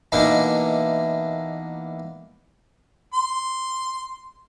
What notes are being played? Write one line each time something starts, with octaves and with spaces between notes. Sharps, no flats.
B2 E3 A#3 D4 D#4
C6